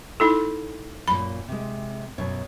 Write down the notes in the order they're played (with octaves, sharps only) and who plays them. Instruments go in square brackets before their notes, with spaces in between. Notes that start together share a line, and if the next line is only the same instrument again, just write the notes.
[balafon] D#4 E4 A4
[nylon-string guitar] F#2 A#2 [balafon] B5
[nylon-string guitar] C3 G#3
F#2 B2 C#5